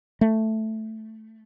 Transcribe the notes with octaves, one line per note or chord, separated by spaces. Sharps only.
A3